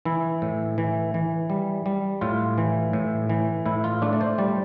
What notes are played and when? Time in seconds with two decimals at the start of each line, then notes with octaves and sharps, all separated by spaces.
0.05 E3 E4
0.42 A2
0.78 E3
1.14 E3
1.50 G3
1.86 G3
2.21 A2 F4
2.58 E3
2.93 A2
3.29 E3
3.66 A2 E4
3.84 F4
4.02 A3 D4
4.13 D5
4.21 C5
4.38 G3 D5